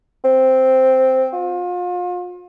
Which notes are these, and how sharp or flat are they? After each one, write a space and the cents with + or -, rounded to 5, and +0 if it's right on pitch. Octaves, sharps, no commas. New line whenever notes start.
C4 -5
F4 +35